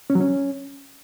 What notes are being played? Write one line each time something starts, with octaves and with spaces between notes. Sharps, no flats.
C#4
F#3
C#4